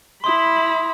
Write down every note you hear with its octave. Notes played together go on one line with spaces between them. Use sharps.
E4 B5 C6 D#6